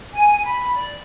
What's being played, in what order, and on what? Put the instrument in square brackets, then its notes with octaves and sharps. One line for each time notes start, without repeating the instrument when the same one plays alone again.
[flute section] G#5
B5
D5